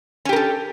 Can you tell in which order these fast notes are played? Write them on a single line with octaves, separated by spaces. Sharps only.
C#4 G4 A#4 A4